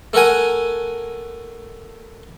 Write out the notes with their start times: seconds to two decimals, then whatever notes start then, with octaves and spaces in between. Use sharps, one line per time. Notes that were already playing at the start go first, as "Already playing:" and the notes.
0.13 A3 A4 A#4 F#5 G#5